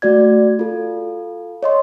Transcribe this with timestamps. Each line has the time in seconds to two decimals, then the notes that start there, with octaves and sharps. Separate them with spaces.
0.02 A3 F#4 D5 G#6
0.59 F4 A4
1.63 C#5 D#5 C6